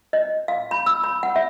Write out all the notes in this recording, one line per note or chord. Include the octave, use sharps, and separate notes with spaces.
D#5
F5
B5
E6
B5
F#5
E5